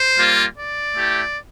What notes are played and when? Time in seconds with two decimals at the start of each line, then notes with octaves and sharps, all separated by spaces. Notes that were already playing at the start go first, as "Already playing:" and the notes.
Already playing: C5
0.17 G3 A#3 F4
0.56 D5
0.94 A3 E4 G4